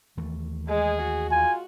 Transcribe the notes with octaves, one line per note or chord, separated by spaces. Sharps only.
D#2 E3 A3
G#3 G#4
F#4
F4 G#5